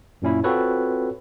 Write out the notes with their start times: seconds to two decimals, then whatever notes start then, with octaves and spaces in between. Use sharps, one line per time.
0.22 F#2 A#2 C#4 E4
0.44 C4 F4 F#4 A4 B4 C#5